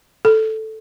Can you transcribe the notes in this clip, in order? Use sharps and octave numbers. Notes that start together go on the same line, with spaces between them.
A4